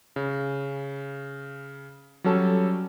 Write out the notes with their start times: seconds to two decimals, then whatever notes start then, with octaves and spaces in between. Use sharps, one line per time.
0.16 C#3
2.24 F#3 G3 C#4 A4 A5